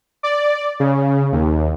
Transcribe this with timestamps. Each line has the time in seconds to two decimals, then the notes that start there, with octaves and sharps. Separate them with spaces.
0.23 D5
0.80 C#3
1.32 D#2